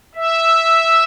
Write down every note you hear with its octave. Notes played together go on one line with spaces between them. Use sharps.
E5